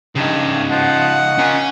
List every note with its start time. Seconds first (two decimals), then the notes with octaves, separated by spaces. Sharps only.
0.16 G2 C#3 D#4
0.71 F3 D#5 F#5
1.38 A#2 C#4 G#5